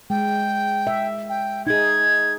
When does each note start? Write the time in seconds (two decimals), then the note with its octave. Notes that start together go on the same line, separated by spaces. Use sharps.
0.10 G#3 G5
0.87 E5
1.29 G5
1.67 D#4 G#4 G#6